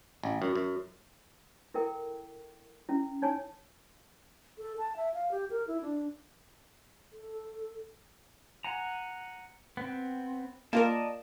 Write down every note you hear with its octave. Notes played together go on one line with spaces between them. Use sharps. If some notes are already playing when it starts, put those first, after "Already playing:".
A1
F#2
F#2
E4 A4 A#4 G5
C#4 E4
D#4 C#5 G#5 A5
A4
A5
E5
F5
G4
A#4
E4
D4
A4
F#5 G#5 A#5
B3 C4
A#3 F4 A#4 D5 D#5 A5